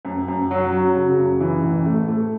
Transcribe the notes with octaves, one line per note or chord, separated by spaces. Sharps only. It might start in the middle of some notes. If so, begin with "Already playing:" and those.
F#2
F#2
F#3
F#3
C#3
F#2
E3
A1
A3
A3